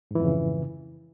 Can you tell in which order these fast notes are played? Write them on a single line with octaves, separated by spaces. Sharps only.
G#2 E3 F2 C#3